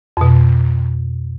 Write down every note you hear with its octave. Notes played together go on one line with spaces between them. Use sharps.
F2 B2